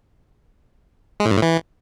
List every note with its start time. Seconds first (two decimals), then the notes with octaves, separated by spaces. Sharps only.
1.20 G#3
1.25 A2
1.31 G2
1.37 A2
1.42 E3